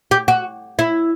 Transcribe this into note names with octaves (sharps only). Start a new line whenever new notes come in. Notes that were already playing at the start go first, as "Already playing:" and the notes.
G4
F#4
E4